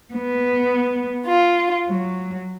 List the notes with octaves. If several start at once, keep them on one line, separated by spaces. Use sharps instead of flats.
B3
F4
F#3